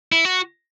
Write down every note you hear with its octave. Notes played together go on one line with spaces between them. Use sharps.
E4
F#4